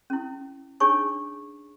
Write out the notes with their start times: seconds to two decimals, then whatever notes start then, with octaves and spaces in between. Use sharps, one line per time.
0.10 C#4 E4
0.80 D4 D#4 G#4 C#5 G#5 C#6